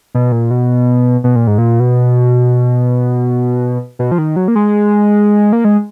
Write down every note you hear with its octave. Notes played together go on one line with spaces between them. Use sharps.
B2
A#2
B2
B2
A#2
G#2
A#2
B2
B2
F3
D#3
F#3
A#3
G#3
A#3
G#3